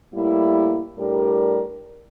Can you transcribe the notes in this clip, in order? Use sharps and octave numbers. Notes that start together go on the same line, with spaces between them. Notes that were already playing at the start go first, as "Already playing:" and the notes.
A2 G3 A#3 E4
A2 G3 D4 G4 A#4